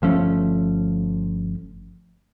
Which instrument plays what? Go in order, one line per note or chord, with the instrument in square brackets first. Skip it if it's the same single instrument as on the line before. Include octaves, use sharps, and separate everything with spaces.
[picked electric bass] G1 F3 A3 C#4